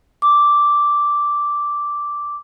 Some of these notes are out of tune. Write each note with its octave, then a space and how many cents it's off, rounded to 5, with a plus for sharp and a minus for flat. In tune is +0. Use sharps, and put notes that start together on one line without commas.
D6 -5